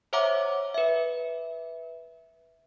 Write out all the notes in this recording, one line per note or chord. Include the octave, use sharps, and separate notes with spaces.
C5 C#5 E5 F#5 A#5 D6
B4 E5